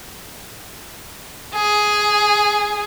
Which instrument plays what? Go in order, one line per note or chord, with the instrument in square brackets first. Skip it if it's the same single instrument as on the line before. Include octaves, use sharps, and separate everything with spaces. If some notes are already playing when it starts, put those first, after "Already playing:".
[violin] G#4